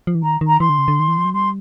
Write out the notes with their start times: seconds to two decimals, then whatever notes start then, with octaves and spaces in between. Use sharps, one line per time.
0.07 F3
0.15 E3
0.23 D#3 A#5
0.41 D#3
0.47 A#5
0.60 E3 C6
0.69 D3
0.78 C#3
0.88 D3
1.00 D#3
1.08 E3
1.18 F3
1.25 F#3
1.33 G3 C6